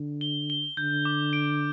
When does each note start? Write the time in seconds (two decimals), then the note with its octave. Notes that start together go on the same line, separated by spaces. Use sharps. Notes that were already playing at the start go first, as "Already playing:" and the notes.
Already playing: D3
0.21 G7
0.50 G7
0.77 D3 G6
1.05 D6
1.33 D7